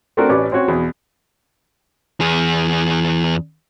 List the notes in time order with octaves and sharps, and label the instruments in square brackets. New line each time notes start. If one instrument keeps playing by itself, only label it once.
[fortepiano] A3 C4 D4 F#4 A#4
A1 C#4 B4 D5 D6
C4 C#4 F#4 C#5
E2 B2
[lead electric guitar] E2 G#4